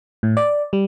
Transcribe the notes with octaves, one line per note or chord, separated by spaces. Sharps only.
A2
D5
G3